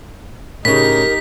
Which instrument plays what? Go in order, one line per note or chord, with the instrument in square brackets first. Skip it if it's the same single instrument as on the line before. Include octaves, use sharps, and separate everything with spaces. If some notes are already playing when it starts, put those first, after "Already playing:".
[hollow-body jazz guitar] A2 C#3 [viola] D#4 G4 [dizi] A#4 [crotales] B6